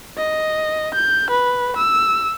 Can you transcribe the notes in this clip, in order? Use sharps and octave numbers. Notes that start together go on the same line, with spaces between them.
D#5
G6
B4
E6